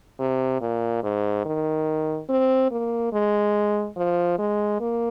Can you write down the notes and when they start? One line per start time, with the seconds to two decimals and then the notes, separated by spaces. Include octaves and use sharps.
0.19 C3
0.61 A#2
1.03 G#2
1.45 D#3
2.29 C4
2.71 A#3
3.13 G#3
3.96 F3
4.38 G#3
4.80 A#3